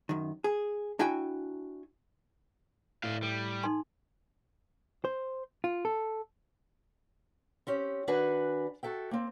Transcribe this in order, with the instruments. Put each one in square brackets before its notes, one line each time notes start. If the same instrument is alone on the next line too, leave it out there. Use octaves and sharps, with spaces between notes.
[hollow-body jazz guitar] F#2 D#3
G#4
D4 E4 F#4 G5 G#5
[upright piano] A2 [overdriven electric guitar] D5 F5
[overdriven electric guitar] G3 [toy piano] A4
[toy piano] D#4 A4 C6 [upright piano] G#5
[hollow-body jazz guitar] C5
F4
A4
[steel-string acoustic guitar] C4 C#4 G4
D#3 D4 F#4 B4 G#5
F#4 A4 E5 G5
A#3 C4